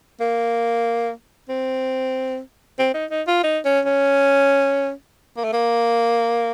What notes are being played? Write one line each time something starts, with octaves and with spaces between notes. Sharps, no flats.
A#3
C4
C4
D#4
D#4
F4
D#4
C#4
C#4
A#3
A3
A#3